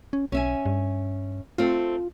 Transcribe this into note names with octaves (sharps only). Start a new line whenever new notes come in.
C#4
B1 C#4 E5 G#5
G2
A3 C4 F4 A4